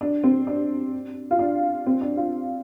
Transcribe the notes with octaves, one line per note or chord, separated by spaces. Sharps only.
D4
C4
D4
F4
D4
C4
D4
F4